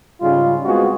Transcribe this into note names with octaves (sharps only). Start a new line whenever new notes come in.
G#2 C#3 G3 G#3 F4
G#3 B3 C4 F4 F#4 G#4